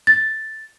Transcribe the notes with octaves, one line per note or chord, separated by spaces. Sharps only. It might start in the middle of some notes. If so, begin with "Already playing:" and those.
A6